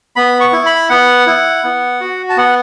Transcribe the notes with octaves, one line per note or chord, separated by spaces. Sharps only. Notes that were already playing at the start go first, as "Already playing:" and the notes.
B3 B5
C#6
E4
B5
B3 F#5
E4
B3
F#4
A5
B3 F#5